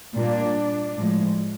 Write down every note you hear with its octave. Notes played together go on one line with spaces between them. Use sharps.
A#2 G3 A#3 D4
A2 F3 G#3